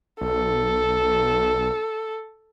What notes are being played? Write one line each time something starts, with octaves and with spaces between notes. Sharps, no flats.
B1 A4